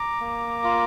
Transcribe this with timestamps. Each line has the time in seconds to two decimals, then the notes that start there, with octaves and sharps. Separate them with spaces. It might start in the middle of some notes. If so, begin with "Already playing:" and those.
Already playing: A#5 D6
0.21 A#3
0.64 F4